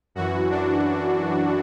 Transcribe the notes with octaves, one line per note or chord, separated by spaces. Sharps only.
F#2 E3 F#4
D4